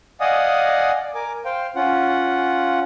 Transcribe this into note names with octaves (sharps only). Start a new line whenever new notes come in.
D5 D#5 F5 F#5 G#5 D#6
D5
A#4 G#5 D6
C5 F5 G5
C#4 F4 F#5